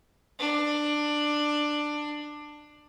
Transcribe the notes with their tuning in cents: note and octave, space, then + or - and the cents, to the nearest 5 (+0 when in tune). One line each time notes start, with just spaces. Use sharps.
D4 +15